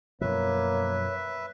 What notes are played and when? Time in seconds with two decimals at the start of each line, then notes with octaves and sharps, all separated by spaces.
0.21 F#2 B2 F3 A#3 B4 C#5 E5